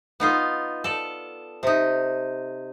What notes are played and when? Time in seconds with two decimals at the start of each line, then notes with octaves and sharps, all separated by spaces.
0.20 B3 D#4 F4
0.84 A4 D5
1.63 C3 D#4